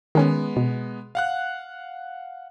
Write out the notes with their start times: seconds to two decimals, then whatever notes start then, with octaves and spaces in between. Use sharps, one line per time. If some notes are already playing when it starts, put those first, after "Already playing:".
0.15 D#3 G#3 B3 C#4
0.57 B2
1.15 F5 F#5 F#6